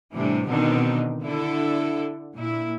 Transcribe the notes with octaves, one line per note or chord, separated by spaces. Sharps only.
A2 C3 E3 G3 D4
B2 D3 D#3 C4 D4 D#4
D3 D4 E4 A4
A#2 E4